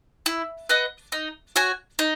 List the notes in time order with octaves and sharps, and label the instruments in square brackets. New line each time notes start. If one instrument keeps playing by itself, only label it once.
[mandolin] E4
B4 D#5 F#5
D#4
F#4 C#5 G#5
D#4